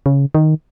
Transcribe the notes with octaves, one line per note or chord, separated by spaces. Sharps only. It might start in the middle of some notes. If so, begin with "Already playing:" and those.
C#3
D#3